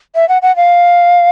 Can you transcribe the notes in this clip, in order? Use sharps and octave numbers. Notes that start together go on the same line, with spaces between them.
E5
F#5
F#5
F5